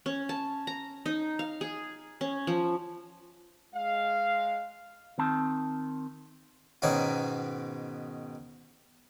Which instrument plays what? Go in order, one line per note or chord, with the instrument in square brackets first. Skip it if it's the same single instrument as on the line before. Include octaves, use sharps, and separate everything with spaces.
[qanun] C#4
A5
A#5
D#4
F5
G#4
C#4
F3
[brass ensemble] G#3 F5
[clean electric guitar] D#3 C4 A5
[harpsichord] G#2 B2 D#3 C#4 F#4